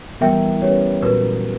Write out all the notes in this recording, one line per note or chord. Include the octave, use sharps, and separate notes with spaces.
E3 G3 B3 E4 A#4 E5 G5
G3 C#4 G4 B4 C#5
A#2 F#3 B3 F#4 A#4 B4